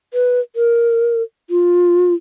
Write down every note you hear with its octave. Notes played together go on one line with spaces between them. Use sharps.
B4
A#4
F4